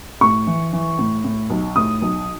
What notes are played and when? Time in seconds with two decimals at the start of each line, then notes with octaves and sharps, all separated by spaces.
0.21 A2 C#6
0.47 E3
0.73 E3
0.99 A2
1.24 A2
1.50 B1
1.76 A2 D#6
2.02 B1